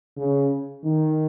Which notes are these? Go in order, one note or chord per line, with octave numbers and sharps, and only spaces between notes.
C#3
D#3